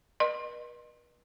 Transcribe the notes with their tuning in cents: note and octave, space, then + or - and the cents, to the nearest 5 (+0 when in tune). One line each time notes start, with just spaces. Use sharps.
B4 -40 D#5 -45 C6 +25